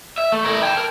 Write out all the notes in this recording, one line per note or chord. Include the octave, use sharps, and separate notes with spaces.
E5
A3
E4 A#4
G5 A5
A#4